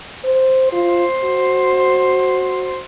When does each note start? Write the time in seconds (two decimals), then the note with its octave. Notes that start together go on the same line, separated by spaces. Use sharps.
0.24 C5
0.73 F4 C5
1.24 F#4